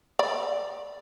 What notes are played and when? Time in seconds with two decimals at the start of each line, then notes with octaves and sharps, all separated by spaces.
0.19 D5 B5